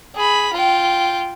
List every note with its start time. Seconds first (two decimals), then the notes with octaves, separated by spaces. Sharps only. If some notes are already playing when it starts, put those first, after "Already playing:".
0.16 G#4 B5
0.53 F4 G5